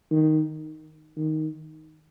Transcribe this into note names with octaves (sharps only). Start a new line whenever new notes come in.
D#3
D#3